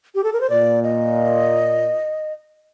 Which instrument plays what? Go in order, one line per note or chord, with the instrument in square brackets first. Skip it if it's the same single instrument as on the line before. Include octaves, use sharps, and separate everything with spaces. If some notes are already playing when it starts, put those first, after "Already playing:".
[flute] G4
A4
A#4
C5
[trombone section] A#2 [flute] D5
[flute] D#5